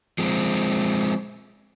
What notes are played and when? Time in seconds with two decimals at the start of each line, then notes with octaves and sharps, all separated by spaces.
0.18 F3 G#3 C4